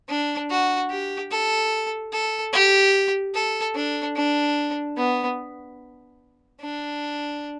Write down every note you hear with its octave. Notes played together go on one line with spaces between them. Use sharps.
D4
F#4
G4
A4
A4
G4
A4
D4
D4
B3
D4